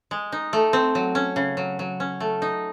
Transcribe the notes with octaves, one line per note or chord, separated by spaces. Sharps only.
G#3
D#4
A3
C4
F#3
C#4
C#3
F#3
F#3
C#4
A3
D#4